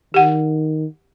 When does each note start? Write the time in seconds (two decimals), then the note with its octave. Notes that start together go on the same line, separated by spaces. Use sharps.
0.14 D#3 G4 F#5